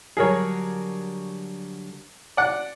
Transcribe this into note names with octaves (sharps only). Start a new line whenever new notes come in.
D3 F#3 G3 G#4 A#4 C#5
D5 F#5